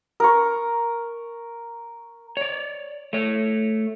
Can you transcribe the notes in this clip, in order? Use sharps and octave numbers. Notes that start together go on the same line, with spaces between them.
A#4 C#6
C#5 D5
A3 C#5